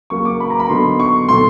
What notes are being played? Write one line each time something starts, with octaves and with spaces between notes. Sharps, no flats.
C#3 F#3 A#3 C#6
D6
B5
A#5
B5
D3 F#3 B3 D#4 C6
C#6
B2 F#3 A3 C6